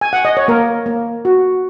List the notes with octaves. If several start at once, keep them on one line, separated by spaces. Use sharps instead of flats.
G#5
F#5
D#5
C#5
A#3 A#4
A#3
F#4